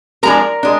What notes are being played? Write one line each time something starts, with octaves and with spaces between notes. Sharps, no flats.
F3 G#3 D4 A#4 A#5
G#3 D4